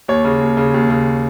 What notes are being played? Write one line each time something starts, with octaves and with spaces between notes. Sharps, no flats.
D#2 C#5
C#3
D#2
C#3
D#2
C#3